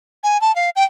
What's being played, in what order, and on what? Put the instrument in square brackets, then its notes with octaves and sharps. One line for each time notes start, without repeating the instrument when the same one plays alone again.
[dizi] G#5
A5
F5
G5